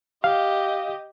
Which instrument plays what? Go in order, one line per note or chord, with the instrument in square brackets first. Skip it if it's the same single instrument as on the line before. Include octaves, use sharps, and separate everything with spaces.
[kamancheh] G4 D#5 [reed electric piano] F5